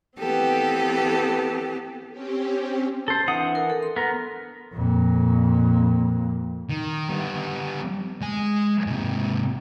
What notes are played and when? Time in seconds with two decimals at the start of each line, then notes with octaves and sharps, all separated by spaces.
0.18 E3 B3 C4 G4 A4
2.12 C4 C#4 G4
3.08 A4 C5
3.28 E3 D4 F#5 D#6
3.55 A#4
3.70 A4
3.83 C6
3.96 B3 A#4
4.73 F2 A#2
6.69 D#3
7.09 G3 B3
8.21 G#3 G#5
8.87 G#2 C3